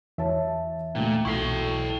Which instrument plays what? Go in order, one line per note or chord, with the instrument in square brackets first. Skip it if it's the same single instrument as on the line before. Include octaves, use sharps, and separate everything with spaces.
[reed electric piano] E2 E3 E5 [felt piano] C#5 A5
[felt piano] D2 G5 [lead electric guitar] A#2
[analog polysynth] B1 B2 A4 [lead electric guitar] E4 G5 [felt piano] C#6 C7